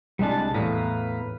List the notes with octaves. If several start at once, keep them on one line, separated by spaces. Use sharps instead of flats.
C2 G3 G#3 D4 A5
E2 A2 B4 F5 A#5